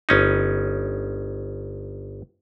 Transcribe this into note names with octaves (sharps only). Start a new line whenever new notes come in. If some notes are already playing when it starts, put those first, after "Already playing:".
G1 C#4 D#4